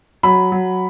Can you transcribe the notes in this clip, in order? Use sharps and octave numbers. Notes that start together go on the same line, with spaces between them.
F#3 B5
F#3